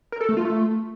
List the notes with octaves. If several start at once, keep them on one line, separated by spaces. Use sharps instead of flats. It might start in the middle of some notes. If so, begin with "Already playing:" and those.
A#4
A4
A3
F4
A3